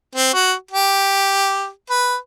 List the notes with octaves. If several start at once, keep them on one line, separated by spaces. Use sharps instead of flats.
C4
F#4
G4
B4